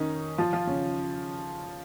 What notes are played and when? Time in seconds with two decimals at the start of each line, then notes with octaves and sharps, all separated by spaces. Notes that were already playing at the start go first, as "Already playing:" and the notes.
Already playing: D#3 C#4 D#4
0.38 F3 F4
0.53 F3 F4
0.67 C#3 C#4